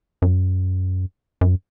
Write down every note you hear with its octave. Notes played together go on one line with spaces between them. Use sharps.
F#2
F#2